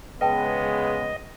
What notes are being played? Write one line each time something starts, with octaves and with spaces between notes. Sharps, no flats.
C#3 G#3 B3 B4 D#5 G5 A5